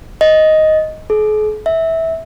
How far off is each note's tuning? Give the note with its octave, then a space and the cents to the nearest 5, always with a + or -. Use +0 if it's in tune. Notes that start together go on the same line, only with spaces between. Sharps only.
D#5 +5
G#4 +45
E5 -15